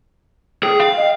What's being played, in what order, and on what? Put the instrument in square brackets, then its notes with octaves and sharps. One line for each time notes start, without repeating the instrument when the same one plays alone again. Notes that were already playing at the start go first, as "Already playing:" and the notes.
[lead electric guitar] G#4 [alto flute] G5
[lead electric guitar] F5
[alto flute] D#5